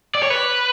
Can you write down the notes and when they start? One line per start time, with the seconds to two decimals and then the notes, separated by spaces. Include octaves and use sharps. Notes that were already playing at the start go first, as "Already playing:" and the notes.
0.15 D5
0.23 C#5
0.30 B4